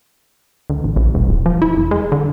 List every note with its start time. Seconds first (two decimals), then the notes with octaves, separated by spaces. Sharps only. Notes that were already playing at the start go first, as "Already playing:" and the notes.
0.70 D2
0.84 A1
0.96 A#1
1.15 E1
1.29 D#1
1.46 F3
1.62 E4
1.77 F1
1.91 G#3
2.12 D3